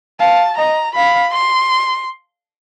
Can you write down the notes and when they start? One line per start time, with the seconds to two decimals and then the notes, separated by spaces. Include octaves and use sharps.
0.20 F5 A5
0.58 D#5 A#5
0.96 F5 B5
1.34 C6